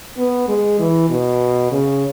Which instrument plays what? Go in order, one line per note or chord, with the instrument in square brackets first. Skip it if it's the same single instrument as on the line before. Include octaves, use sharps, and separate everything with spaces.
[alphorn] B3
G#3
E3
B2
C#3